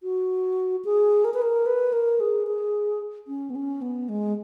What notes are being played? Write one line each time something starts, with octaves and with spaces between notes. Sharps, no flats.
F#4
G#4
A#4
B4
A#4
B4
A#4
G#4
G#4
C#4
B3
C#4
B3
G#3